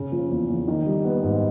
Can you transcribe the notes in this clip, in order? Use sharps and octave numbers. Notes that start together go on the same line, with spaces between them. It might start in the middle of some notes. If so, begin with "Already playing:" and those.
Already playing: C#3
F3
E2
E2
D#3
G3
B3
G#2